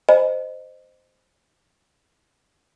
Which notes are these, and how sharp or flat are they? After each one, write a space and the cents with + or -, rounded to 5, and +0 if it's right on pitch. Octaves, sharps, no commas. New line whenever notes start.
C5 -10 D#5 -20